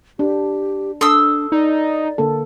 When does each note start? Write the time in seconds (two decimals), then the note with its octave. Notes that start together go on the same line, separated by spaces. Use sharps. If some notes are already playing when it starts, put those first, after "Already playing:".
0.19 D4 G4
1.01 D4 A4 C6 D#6 E6
1.52 D#4 D5
2.18 D3 A#3 A4